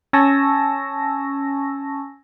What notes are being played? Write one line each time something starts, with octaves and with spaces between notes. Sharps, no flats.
C#4 G#5 A5 C#6 E6 A#6